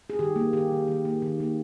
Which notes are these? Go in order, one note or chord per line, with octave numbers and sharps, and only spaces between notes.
G#4
D#3 G4
A#3
D#3 G4
D#3
D#3
A#3
D#3
A#3